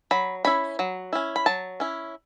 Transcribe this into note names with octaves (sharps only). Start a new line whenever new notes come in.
F#3 B5
C#4 E4 B5
F#3
C#4 E4
B5
F#3 A5
C#4 E4